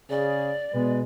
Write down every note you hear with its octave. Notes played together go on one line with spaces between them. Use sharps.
C#3 G#4 D5
B2 G#3 B4